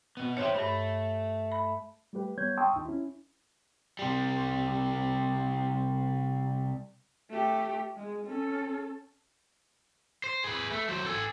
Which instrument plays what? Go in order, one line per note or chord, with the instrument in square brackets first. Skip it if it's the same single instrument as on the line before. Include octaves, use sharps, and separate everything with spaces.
[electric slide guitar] B2 B3
[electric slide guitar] D#4 G4 C5 [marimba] C#5 E5
[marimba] G2 B5 [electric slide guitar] A3
[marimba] B5
[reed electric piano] G3 A3 G4 B4
G3 B3 C#5 G6 G#6
G5 A5 C6 C#6 D#6 E6
D#2 D#4
C#4 E4
[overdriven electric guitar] C3 G3
[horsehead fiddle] A3 G4
G#3
C#4 A4
[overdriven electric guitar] C5
G#4 B4
A3
F#3 C5
A4 G#5